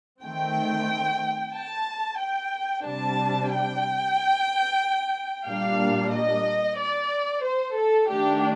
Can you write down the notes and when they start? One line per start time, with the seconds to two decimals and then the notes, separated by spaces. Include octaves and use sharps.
0.22 D#3 A3 C4 G5
1.54 A5
2.20 G5
2.85 C3 G3 D4 A5
3.51 G5
5.48 A#2 G3 A#3 D4 F5
6.14 D#5
6.79 D5
7.45 C5
7.77 A4
8.10 D#3 A3 D4 G4